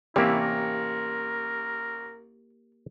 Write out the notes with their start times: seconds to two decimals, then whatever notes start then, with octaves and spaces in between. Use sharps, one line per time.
0.16 A1 C3 A#3 E4 G4 F5
0.40 A#4